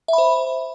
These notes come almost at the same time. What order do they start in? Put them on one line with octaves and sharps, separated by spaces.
E5 B5 C5